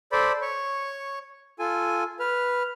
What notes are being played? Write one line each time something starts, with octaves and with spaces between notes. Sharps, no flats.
A4 C5 D5 B5
C#5 C#6
F4 A4 G#5
B4 F6